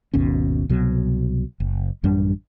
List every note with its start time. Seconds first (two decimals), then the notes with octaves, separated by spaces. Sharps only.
0.14 G#1 D#2 B2 C#4
0.69 C2 B2 F#3
1.60 F#1
2.03 A1 F#2 G3 D4